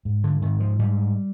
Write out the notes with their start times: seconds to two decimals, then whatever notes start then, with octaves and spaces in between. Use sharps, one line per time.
0.05 G#2
0.24 D3
0.42 G#2 D#3
0.60 F3
0.79 G#2 G3